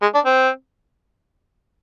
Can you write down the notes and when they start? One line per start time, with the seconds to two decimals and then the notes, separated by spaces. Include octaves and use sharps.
0.02 G#3
0.14 D4
0.25 C4